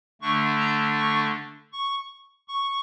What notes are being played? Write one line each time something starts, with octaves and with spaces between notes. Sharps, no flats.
D3 A3 D4 C#6
A#5
C#6
C#6
C#6